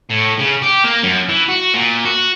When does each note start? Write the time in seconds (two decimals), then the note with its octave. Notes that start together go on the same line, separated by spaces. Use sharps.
0.10 A2
0.39 C#3
0.62 G4
0.84 A#3
1.03 F#2
1.29 E3
1.48 F#4
1.74 A#2
2.05 F#4